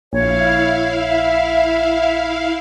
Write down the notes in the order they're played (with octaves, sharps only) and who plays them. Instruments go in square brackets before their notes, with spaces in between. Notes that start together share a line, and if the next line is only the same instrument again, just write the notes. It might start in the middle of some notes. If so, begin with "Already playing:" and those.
[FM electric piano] A#1 [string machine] E4 F5 [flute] C#5
[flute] E5